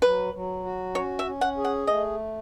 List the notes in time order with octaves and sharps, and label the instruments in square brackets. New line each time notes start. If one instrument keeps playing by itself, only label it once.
[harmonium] F#3 [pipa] B4
[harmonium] F#3
F#4
[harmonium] C#4 [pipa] C#5
[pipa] E5
[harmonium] C#4
[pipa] F#5
[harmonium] G#4
[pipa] F#5
[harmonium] A3 [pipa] D#5